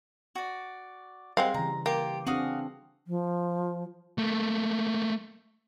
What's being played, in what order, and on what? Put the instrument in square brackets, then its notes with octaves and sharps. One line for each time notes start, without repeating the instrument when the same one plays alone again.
[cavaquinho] F#4 D5
[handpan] G3 [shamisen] G#3 C4 F5 [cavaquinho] F#5 C6
[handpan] C#3 E3 [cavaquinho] A#5
[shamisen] A#3 [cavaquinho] F4 G4
[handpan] C4 D4 G#4 [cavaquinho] F#4 F5 D#6
[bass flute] F3
[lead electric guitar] A3 A#3